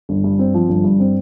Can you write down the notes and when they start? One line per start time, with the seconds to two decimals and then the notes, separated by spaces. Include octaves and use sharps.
0.09 G1
0.24 G2
0.39 C4
0.54 F3
0.69 G1
0.84 G2
1.00 C4